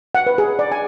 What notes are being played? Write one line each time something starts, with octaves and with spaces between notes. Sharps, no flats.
F#5
B4
G#4
D5
G#5